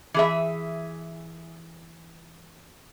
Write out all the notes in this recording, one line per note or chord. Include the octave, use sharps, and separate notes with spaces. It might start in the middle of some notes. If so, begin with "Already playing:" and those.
E3 G#4 E5